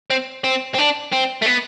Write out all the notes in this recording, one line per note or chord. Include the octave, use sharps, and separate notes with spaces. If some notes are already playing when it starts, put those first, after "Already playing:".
C4
C4
C4
D4
C4
A3
B3